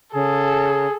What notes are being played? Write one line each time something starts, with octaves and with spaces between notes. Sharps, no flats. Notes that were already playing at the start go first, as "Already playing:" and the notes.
C#3 G#4 A4